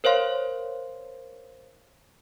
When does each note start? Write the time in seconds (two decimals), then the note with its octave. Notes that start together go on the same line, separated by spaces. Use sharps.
0.04 A#4 C5 C#5 F5 C6